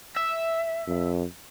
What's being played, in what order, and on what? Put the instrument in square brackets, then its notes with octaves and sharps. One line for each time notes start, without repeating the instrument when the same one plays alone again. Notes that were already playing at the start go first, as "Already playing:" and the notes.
[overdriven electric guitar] E5
[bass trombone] F2